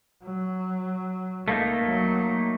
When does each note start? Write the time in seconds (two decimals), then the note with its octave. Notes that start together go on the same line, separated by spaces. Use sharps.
0.23 F#3
1.48 C#2 A3 A#3 D#4
1.85 F#3